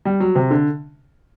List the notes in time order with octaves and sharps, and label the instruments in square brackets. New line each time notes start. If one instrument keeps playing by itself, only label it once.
[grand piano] G3
F#3
C3
D3